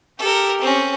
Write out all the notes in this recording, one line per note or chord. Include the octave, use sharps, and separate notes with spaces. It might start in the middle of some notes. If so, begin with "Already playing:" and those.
G4 A4 A#4
C4 C#4